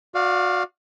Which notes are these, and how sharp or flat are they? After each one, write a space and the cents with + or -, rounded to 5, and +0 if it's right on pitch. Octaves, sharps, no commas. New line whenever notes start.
F#4 -30 D5 +0 F5 +0